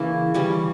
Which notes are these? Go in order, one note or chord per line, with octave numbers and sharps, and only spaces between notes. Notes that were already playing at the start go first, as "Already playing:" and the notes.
Already playing: C#3 E3 A#3 E4
E3 G3 C#4